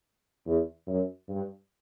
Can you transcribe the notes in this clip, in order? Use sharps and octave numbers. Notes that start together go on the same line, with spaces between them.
E2
F#2
G2